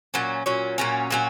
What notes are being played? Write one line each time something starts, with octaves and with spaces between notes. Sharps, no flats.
A#2 F#3 C#4
A#2 F#3 C#4
A#2 F#3 C#4
A#2 F#3 C#4